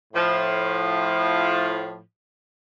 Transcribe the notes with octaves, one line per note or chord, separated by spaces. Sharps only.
A2 F3